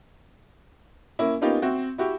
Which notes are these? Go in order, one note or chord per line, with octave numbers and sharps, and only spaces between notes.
A#3 C#4 E4
A#3 B3 C#4 D#4 F4 G4
C4 F#4 E5
E4 F#4 G4